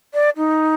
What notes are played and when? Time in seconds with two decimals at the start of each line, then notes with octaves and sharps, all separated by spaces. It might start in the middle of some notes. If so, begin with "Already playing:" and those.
0.14 D5
0.37 D#4